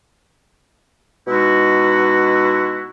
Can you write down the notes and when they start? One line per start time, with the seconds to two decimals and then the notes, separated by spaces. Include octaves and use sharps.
1.28 B2 G#3 D#4 E4 F#4